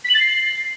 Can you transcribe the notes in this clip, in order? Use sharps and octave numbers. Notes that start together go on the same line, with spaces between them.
B6
F#7
A6
C7